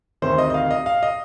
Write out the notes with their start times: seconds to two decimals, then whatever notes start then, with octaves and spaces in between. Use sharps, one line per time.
0.22 D2 C3 D#3 C5
0.38 D#5
0.50 D#5
0.54 F5
0.71 D#5
0.86 F5
1.03 D#5